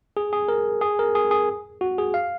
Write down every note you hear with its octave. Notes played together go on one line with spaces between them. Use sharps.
G#4
G#4
A#4
G#4
A#4
G#4
G#4
F#4
G#4
F5